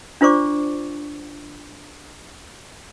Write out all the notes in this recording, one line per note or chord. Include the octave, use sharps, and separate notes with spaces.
D4 F4 C5 D5 C#6 D6